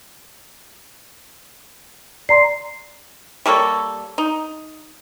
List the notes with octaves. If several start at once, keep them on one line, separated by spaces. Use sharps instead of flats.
D5 A#5 C6 C7
G3 A#3 A4 C#5
D#4